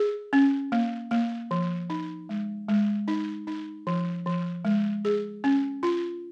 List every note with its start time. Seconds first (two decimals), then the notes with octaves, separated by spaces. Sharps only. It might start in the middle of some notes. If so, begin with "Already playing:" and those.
Already playing: G#4
0.33 C#4
0.72 A#3
1.11 A#3
1.51 F3
1.90 D#4
2.29 G#3
2.69 G#3
3.08 D#4
3.47 D#4
3.87 F3
4.26 F3
4.65 G#3
5.05 G#4
5.44 C#4
5.83 F4